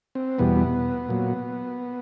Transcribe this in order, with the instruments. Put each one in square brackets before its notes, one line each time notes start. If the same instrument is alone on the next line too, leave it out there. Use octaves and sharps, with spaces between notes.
[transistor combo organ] C4
E2 B2 G3 B3
A#2 F#3